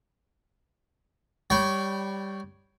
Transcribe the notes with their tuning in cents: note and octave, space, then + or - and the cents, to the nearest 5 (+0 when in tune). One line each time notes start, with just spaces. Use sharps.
G3 +0 C#5 +5 G5 -30